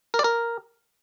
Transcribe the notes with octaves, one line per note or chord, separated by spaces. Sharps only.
A#4
D5
A#4